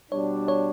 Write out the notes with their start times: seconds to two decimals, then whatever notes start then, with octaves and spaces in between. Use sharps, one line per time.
0.11 B2 G3 D4 C#5
0.48 C#5